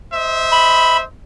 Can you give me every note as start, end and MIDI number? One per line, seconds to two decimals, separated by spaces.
0.13 1.05 72
0.13 1.05 75
0.13 1.05 76
0.52 0.97 83